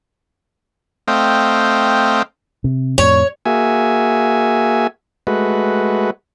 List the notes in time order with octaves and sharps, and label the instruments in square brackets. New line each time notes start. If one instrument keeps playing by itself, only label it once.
[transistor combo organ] A3 C4 D#5 F5 G5
[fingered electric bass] C3
[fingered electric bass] F2 A2 [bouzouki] C#5
[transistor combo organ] A#3 F#4 G#4 E5 G#5
G#3 A3 F#4 B4